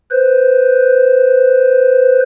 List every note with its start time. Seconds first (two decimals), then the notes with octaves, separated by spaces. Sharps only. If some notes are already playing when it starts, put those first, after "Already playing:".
0.11 B4 C5